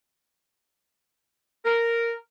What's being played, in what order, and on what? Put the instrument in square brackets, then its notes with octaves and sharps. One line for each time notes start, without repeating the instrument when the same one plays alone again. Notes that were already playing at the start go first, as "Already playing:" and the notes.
[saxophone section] A#4